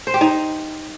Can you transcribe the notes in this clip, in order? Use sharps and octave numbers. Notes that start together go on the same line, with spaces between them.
C5
G4
D#4